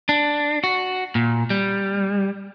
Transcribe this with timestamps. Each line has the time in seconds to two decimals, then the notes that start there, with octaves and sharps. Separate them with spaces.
0.09 D4
0.64 F#4
1.15 A#2
1.50 G3